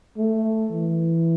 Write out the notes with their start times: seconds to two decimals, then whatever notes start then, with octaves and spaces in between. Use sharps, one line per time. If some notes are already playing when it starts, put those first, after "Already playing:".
0.18 A3
0.70 E3